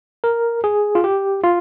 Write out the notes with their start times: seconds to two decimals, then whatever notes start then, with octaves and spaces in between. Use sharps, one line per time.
0.24 A#4
0.64 G#4
0.95 F4
1.04 G4
1.44 F4